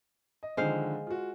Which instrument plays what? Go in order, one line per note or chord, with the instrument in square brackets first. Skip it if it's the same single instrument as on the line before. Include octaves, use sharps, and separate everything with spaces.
[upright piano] D#5
[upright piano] D3 D#3 F3 [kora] G#3 C5 F5
[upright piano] F4 F#4